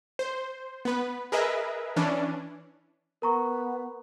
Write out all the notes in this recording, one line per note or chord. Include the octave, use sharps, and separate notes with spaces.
C5
B3 B4
G#4 A#4 B4 D#5 E5
E3 C#4 D4
B3 A#4 A#5 C#6